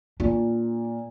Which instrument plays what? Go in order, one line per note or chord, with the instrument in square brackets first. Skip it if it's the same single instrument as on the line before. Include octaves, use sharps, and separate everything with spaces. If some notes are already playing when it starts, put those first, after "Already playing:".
[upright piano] A#2 [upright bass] D4